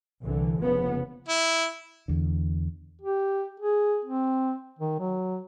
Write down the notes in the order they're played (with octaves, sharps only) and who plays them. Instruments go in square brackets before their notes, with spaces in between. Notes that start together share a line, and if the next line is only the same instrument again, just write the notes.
[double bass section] C2 D3 E3
F1 C#3 F3 B3
[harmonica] E4
[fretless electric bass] E2 D3
[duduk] G4
G#4
C4
D#3
F#3